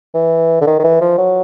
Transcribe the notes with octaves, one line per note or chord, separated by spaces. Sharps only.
E3
D3
D#3
D#3
E3
F3
F#3